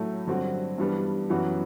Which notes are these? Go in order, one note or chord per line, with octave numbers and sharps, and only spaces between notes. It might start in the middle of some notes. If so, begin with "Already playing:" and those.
Already playing: A2 F#3 A3
G2 D3 F#3 C4 F#4
G2 E3 G3 B3 D4
F#2 E3 B3 F#4